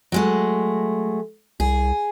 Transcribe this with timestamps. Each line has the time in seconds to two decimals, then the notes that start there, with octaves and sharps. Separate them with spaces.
0.12 F#3 G#3 A3
1.60 C2 G#4